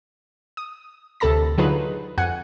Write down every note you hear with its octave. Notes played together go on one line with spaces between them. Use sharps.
D#6
D2 C3 A4 A5 B5 A#6
D3 F#3 D#4 F4 G#4 B4
F2 F#5 G#5 F#6 C#7